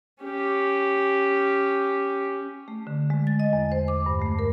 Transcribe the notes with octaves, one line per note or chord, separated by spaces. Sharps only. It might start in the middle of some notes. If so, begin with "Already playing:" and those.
C#4 G4
A3
D3
G#3
A6
D#5
E2
C5
D6
G2
A3
A#4